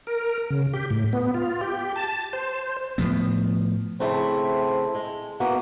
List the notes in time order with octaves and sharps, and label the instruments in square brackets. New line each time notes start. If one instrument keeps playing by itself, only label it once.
[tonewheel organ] A#4
C#3
G4
A2
B3
F4
G4
A5
C5
[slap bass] A2 F3 B3
[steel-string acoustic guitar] C#3 A3 E4 [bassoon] C4
[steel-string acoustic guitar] G#3
[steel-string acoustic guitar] A#3 B3 E4 [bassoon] F#4